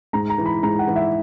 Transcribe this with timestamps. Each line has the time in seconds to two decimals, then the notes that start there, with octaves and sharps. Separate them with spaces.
0.13 G#2 A#5
0.30 A#5
0.38 E3
0.46 B5
0.63 G#2 A#5
0.79 F#5
0.87 E3
0.96 E5